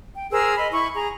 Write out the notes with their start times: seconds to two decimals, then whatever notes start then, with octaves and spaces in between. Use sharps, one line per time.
0.14 G5
0.31 G#4 A#4 C5 E6
0.56 D#5 B5
0.71 E4 B5 C#6
0.94 G#4 A#5